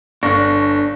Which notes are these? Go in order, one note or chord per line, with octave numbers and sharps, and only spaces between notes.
G1 D4 F5 C#6 F#6 A#6